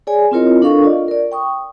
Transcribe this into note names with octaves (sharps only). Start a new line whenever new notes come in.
G#4 C#5 D5 G#5
C4 E4 F4 A#4 C#5 D#5
D4 A4 A#4 F5 C#6
F4 D5 D#5
A#4 D5
G5 C#6 D#6